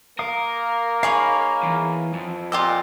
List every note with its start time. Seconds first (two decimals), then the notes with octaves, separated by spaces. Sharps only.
0.19 A#3 A#4 F5 D#6
1.03 D#4 G#4 C#5 F5 A#5 B5
1.63 E2
2.13 F2
2.52 A#2 F4 G4 D#5 E6